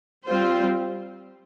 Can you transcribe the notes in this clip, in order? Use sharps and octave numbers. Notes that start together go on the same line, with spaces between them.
G3 C4 F4 C5